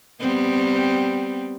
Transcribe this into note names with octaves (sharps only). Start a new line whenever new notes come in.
G3 B3 C4